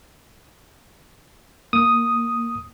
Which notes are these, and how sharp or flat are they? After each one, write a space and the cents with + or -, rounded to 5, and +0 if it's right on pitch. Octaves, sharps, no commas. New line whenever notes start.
A#3 +0 D#6 +0